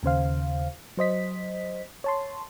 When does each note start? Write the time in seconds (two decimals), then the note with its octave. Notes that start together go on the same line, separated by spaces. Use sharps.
0.03 D#2 C#3 C5 F5
0.97 F#3 C5 D#5 B6
2.04 C#5 A5 C6